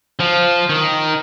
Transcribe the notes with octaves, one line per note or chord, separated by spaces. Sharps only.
F3
D#3